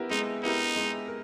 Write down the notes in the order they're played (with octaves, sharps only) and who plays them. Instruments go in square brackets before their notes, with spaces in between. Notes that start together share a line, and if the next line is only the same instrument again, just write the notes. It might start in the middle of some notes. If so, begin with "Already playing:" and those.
Already playing: [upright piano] B3 E4 G4 A#4
[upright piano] G#3 [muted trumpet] D#4
[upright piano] B3 E4 G4 A#4 [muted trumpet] D#4
[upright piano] G#3
A#4